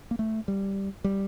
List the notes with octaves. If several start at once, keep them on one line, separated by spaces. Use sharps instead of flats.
A#3
A3
G3
G3